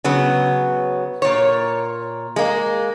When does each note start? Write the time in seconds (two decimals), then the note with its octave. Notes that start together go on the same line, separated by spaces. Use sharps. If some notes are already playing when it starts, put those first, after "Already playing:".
0.04 C#3 F#3 B3
1.22 A#2 C#5
2.36 G#3 A#3